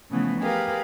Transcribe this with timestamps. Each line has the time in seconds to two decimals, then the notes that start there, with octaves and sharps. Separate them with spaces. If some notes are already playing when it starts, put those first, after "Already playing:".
0.11 C#3 E3 F3 A3 B3
0.40 G4 G#4 A#4 B4 F5